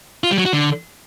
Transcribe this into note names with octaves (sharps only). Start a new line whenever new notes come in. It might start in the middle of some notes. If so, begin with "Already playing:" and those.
F4
G3
F#3
F#4
D3